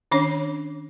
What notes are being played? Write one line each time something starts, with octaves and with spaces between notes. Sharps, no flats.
D#3 C#4 D4 C#5